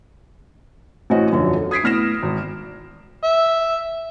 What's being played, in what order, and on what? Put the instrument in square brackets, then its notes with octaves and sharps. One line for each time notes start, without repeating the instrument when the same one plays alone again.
[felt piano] A1 A2 C#4 F#4 C5 D#5
E1 F#2 D3 F3 C#5
A4
D#6 G#6 B6 C7 D7
A2 B3 F6 A#6 E7
G#1
[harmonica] E5